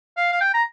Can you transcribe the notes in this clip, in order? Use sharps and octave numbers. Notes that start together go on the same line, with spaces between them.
F5
F5
G5
A#5